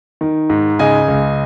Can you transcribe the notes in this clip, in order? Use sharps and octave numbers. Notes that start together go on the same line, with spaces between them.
D#3
G#2
C#3 D#5 G#5
C#2